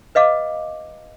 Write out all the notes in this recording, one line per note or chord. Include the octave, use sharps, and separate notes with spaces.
B4 D#5 F5 D6